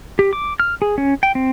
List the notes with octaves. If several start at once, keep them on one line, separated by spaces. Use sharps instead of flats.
G4
D6
F6
G#4
C#4
G5
C4